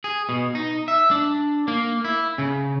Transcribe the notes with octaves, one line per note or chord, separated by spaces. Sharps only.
G#4
B2
D#4
E5
D4
A#3
E4
C#3